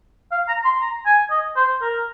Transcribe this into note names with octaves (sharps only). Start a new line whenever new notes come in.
F5
A#5
C6
A#5
G#5
D#5
C5
A#4